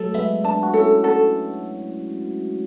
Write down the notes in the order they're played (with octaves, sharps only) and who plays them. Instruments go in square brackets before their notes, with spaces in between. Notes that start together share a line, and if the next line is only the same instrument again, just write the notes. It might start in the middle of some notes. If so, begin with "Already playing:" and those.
Already playing: [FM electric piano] F#3 A3 [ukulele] A4
[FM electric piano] G#3 B3 [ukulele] E5
[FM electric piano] B3 D4 [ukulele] A5
[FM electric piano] F#4
[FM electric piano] C#4 E4 [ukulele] A4
[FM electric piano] D4 F#4 [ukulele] A4